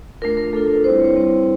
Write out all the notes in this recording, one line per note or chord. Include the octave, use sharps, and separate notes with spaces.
A3 D4 F4 A#4
A#4
A3 D4 F4 A4
A#4
B4
G3 C4 E4 C5
C#5
G3 C4 E4